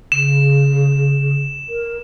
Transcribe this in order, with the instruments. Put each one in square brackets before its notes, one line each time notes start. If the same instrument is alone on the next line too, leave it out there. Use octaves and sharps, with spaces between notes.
[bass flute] C#3 [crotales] E7
[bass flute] A#4